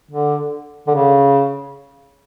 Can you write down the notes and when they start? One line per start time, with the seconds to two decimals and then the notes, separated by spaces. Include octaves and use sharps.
0.11 D3
0.87 D3
0.94 C#3